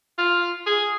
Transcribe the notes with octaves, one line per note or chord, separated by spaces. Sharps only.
F4
G#4